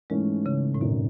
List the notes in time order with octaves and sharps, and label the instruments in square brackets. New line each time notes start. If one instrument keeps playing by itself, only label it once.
[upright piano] G#2 E3 A3 C#4 [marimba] G#3
[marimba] C#3
A2
[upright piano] G#1 F#2 D#3 [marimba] B2